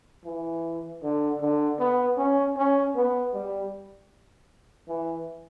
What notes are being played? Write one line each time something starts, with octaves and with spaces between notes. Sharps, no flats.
E3
D3
D3
B3
C#4
C#4
B3
G3
E3